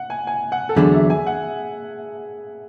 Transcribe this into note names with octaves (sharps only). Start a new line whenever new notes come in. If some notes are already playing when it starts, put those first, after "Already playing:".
Already playing: F#5
G#5
G#5
F#5
A4
E2 D3 F#3 A3 D4 G#4
E5
G#5
F#5